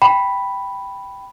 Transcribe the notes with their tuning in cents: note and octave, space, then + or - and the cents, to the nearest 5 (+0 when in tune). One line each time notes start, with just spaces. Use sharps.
G5 +0 B5 +0